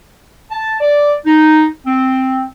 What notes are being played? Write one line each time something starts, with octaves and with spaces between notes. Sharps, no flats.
A5
D5
D#4
C4